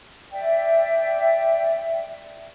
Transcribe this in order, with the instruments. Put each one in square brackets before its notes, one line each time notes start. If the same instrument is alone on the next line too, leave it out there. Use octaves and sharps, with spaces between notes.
[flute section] D5 E5 G5